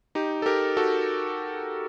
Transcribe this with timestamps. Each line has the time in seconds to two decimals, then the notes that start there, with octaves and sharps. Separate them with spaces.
0.15 D#4 G4
0.42 A4
0.46 G4 A#4
0.77 F#4 A4